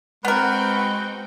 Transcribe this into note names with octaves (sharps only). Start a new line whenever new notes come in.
G#3 B3 C4 F#4 A#4 B4 G5